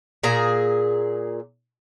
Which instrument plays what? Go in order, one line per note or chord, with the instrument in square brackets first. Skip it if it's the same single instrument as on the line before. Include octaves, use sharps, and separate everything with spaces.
[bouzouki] A#2 G#4 A#5